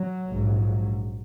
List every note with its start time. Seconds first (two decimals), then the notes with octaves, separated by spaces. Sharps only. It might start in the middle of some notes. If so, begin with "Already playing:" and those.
Already playing: F#3
0.28 A#1 G#2